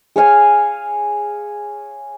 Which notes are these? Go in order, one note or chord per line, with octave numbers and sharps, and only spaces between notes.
G#4 C#5 F5 G#5